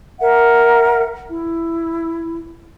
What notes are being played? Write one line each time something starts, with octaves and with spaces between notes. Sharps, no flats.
A#4 E5 F#5
E4